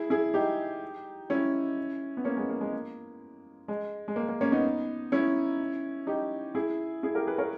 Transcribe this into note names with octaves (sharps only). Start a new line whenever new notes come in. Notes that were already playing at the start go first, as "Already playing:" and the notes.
Already playing: E4 G#4
E4 G#4
D#4 G4
C#4 E4
B3
A#3 C#4
G#3 B3
A#3
G#3
A#3
G#3
G#3
A#3
A#3
A#3 C#4
B3 D#4
C#4 E4
D#4 G4
E4 G#4
E4 G#4
G4 A#4
G#4 B4
A#4 C#5